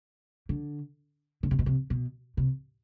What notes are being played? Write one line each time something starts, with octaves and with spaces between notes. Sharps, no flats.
D3
D3
C3
B2
C3
B2
C3